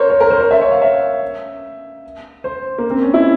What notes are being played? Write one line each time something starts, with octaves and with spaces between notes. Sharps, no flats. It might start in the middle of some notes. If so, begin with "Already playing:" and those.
Already playing: A#4 C5 C#5
C#5
A#4
C5
C#5
E5
C#5
F5
E5
C5
A#3
C4
C#4
E4